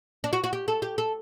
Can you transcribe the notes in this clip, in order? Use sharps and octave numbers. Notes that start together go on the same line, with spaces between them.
D4
F#4
F#4
G4
A4
G4
A4